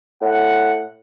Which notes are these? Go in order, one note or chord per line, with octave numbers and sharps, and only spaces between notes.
A2 F#5